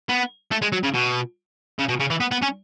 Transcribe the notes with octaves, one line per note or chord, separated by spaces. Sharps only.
B3
A3
G#3
F#3
C#3
B2
C#3
B2
C#3
E3
B3
B3
C#4